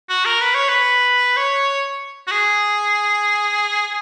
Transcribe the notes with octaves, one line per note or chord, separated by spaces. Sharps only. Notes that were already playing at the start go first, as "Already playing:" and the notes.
F#4
A#4
B4
C#5
B4
C#5
F#4
G#4